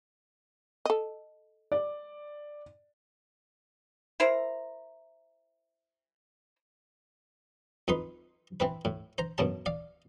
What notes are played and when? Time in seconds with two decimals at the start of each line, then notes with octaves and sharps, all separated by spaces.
0.85 A4 D#5
1.72 D5
4.20 E4 A#4 C5 A#5
7.88 F2 D#4 B4 C6
8.60 E3 C4 B4
8.85 A2
9.18 C5 A#5
9.38 F#2 B2 F#3 A5
9.66 D5 F5